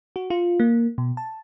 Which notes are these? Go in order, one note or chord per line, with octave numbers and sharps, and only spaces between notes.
F#4
F4
A#3
B2
A5